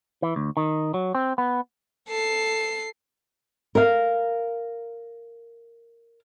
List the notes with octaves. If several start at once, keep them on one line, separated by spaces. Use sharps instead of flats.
E3
D2
D#3
F#3
C4
B3
A4 C7
A#4 F5